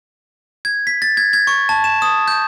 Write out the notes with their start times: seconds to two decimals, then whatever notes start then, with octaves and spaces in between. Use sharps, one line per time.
0.65 G#6
0.87 B6
1.02 A6
1.17 G#6
1.33 G#6
1.47 C#6
1.69 A5
1.84 E7
2.02 D#6
2.28 G6